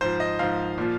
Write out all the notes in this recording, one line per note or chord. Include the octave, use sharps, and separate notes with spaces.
G#2 F3 C5
D#5
G#2 F3 F5
A#2 F3